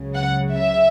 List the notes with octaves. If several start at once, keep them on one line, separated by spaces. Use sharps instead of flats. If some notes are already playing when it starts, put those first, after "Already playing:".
Already playing: C#2 C#3 F#3
F#5
E5